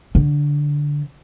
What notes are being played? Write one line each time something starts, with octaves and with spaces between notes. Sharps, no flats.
D3